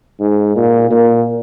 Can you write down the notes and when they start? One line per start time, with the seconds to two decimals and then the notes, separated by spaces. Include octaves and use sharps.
0.20 G#2
0.56 A#2
0.91 A#2